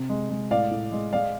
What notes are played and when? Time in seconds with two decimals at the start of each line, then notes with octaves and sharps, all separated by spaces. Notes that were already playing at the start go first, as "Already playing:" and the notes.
Already playing: C3
0.09 G#3
0.30 G#3
0.51 A2 D5 F5
0.71 A2
0.92 G#3
1.13 G#3 D5 F5